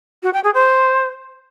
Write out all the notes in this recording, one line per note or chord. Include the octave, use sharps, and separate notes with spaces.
F#4
G5
G#4
C5